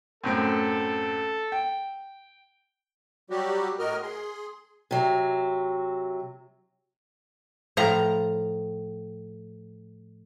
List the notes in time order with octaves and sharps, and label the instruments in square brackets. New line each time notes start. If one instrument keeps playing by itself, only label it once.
[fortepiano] F#2 A2 C4 [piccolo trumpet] A4
[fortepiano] G5
[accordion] F#3 G3 F#4 G4
A2 F#4 A#4 D#5 F6
G#4 C6
[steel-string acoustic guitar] C3 F#3
[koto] A2 F3 A#5